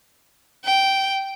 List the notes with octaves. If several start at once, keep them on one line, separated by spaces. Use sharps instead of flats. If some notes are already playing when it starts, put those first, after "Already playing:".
G5